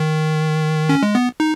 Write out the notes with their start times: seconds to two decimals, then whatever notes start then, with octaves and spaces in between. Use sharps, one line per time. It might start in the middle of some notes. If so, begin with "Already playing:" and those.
Already playing: D#3
0.89 C#4
1.03 G#3
1.15 B3
1.40 D#4